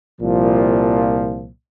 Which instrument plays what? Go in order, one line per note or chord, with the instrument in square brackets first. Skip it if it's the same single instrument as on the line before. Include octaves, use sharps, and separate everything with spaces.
[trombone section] C2 A#2 F3